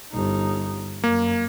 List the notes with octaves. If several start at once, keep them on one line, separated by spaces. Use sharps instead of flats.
G1 D#4
F#2 A#3